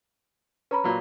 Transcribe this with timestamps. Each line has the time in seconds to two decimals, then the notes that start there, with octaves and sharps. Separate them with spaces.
0.71 C#4 B4 A#5 B5
0.84 A#2 F#3